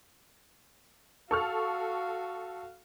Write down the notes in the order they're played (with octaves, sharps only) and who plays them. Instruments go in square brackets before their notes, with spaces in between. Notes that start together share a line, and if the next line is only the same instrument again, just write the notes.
[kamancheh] F#4 F5 [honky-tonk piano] A4 C#6 F6